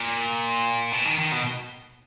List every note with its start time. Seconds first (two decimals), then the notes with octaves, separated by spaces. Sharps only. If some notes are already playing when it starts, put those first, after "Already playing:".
Already playing: A#2
0.92 B2
1.05 D#3
1.19 D#3
1.32 B2